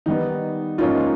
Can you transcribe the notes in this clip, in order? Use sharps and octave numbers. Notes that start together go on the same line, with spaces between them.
D#3 G3 B3 D#4
G#2 F3 A#3 C#4 D#4 F4